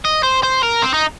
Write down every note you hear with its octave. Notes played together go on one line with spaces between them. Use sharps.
D#5
C5
C5
A#4
C4
D#4